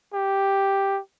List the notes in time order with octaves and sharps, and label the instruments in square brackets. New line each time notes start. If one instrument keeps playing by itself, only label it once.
[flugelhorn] G4